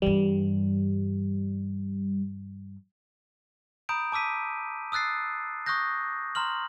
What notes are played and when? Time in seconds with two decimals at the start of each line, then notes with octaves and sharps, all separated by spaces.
0.02 G2 E3 G3
3.89 A#5 B5 D#6 G6 D7
4.12 A5 D6 E6 B6 D#7
4.92 D#6 E6 F#6 A6 C7
5.66 C#6 D#6 F#6 G6 A#6
6.35 A#5 C6 F6 F#7